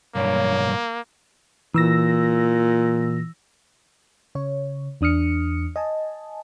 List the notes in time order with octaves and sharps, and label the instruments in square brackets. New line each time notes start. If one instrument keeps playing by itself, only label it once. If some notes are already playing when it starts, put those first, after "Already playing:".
[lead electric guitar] B1 G2 [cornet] A#3 [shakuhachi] C#5
[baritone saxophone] A#2 [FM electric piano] E3 E6 A#6
[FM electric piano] C#3 C#5
E2 D4 D#6 F6 C#7
D#5 G#5 A5